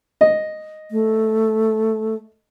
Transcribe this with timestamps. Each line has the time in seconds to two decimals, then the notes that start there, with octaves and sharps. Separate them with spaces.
0.21 D#5
0.91 A3